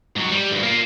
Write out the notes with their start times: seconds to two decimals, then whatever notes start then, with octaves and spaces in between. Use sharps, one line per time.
0.16 G#2 F#3
0.31 G3
0.50 D2 G2
0.63 A#3 F4